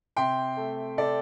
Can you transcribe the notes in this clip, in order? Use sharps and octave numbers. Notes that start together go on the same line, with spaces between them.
C3 G5 C6
A3
C3 A4 D5